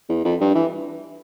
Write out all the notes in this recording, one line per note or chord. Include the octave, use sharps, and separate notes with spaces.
E2
F2
G2
E3